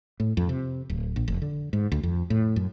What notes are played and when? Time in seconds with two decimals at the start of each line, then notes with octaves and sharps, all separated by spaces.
0.20 A2
0.37 F2
0.49 C3
0.90 D1
1.16 A#1
1.28 F1
1.42 D3
1.73 G#2
1.92 D2
2.03 F2
2.30 A2
2.56 F#2